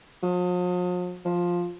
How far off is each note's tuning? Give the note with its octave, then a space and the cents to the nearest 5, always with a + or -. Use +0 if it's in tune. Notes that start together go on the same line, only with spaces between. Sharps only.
F3 +45
F3 +5